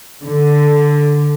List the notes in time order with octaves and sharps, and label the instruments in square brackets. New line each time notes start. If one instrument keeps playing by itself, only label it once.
[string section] D3